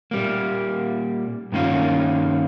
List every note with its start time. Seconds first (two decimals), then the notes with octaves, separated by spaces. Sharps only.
0.11 A#2 G3 A#3
1.52 G2 D#3 A#3 C#4 F4